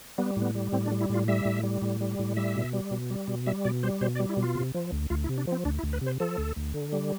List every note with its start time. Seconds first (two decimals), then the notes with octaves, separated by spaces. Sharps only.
0.18 G3 B3
0.37 A2
0.42 B3
0.55 G3
0.72 A2 C4
0.86 D4
0.92 G3
1.01 E4
1.09 A2 F4
1.28 G3 E5
1.45 A2
1.63 G3
1.82 A2
2.01 G3
2.19 A2
2.37 G3 E5
2.56 B2
2.73 G3
2.91 B2
3.10 G3
3.28 B2
3.46 G3 E5
3.65 B2 D5
3.83 G3 C5
4.01 B2 C5
4.15 D5
4.19 G3
4.29 E4
4.37 B2
4.43 F4
4.55 C3
4.75 F3
4.92 D2
5.10 D2 F4
5.24 E4
5.29 C3
5.38 D4
5.47 F3 C4
5.65 D2 D4
5.79 E4
5.83 D2
5.93 B4
6.01 C3
6.06 C5
6.20 F3 A4
6.38 D2
6.56 D2
6.74 D3
6.93 G3